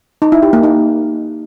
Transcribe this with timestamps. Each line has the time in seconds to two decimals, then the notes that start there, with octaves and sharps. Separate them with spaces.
0.22 D#4
0.32 E4
0.43 G4
0.53 A#3
0.63 D#4